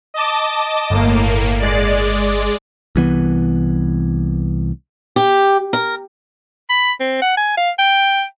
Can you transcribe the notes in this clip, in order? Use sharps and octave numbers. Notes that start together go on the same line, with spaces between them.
D#5 A5 D6
G1 A2 A#3
G#3 D5
C2 E3 B3
G4
A#4
B5
C4
F#5
G#5
F5
G5